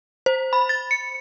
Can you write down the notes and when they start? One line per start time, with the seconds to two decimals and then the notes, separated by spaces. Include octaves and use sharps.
0.26 C5
0.53 B5
0.69 A6
0.91 C#7